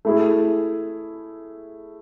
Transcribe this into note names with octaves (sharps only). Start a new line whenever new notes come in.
A3 E4 G#4